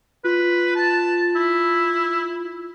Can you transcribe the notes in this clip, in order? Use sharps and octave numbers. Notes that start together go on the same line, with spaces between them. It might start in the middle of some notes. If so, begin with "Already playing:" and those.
F4 B4
A5
E4